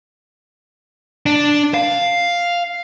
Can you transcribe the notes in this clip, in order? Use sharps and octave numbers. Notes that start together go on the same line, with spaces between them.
D4
F5